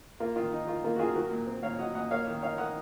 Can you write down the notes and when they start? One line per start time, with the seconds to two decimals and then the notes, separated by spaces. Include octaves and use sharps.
0.20 A#3 F4
0.36 D#3 F4
0.52 D#4
0.63 D#4
0.67 D#3 F4
0.84 A#3 F4
0.96 F#4
0.99 D#3 F4 G#4
1.15 F#3 F#4 A#4
1.31 A#2
1.47 C4
1.63 A#2 C#5 F5
1.79 F#3 D#5 F#5
1.95 A#2 D#5 F#5
2.11 A#3 C#5 F5
2.27 D#3
2.42 D#4 C#5 F5
2.58 D#3 D#5 F#5